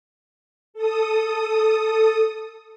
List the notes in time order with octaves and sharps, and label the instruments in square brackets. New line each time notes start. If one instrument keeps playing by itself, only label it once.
[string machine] A4 D#6